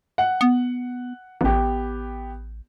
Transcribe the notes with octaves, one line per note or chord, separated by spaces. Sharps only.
F#5
B3
A1 B3 G4